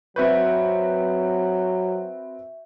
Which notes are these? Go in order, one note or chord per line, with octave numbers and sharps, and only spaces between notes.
F#3 C4 F#4 B4 E5 C#6 G6